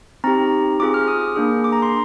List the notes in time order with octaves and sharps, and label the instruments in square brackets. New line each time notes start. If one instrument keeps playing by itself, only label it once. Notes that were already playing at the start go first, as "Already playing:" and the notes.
[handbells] C4 D#4 G4 A#5
C4 F4 G#4 D6
F6
D#6
A#3 D4 G#4
D6
A#5
C6